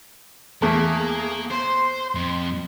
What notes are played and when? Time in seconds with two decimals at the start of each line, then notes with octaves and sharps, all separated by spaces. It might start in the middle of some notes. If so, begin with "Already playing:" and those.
0.62 E2 A3 A#3 G#4
1.51 C5 C6
2.15 F2